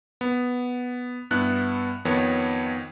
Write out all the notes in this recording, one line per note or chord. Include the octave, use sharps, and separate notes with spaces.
B3
G2 B3 E4 F#6
F2 D#3 B3 C#5